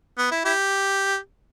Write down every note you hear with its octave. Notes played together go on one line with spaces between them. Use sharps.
B3
E4
E4 G4